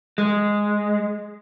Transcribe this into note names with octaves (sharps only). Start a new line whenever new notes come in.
G#3